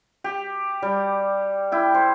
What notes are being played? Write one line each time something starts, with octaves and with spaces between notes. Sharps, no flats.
G4
G3
E4 G5
C5